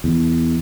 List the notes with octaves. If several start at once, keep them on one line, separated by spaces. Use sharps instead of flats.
E2